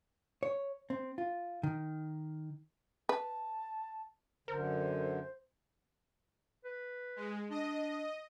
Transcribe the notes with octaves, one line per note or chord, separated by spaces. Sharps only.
C#5
C4
F4
D#3
B4 A5
F#2 D3 A#4 C5
B4
G#3
D4 D#5